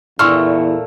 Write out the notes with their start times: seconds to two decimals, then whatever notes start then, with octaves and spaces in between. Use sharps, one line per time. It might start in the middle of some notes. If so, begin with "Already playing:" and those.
0.19 E2 A#2 A3 E4 C6 C#6 E6 F6